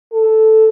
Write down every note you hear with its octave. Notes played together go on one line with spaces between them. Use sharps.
A4